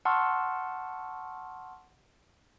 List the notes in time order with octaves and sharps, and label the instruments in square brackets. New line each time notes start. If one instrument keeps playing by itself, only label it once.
[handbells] F#5 A5 C6 C#6 E6 F6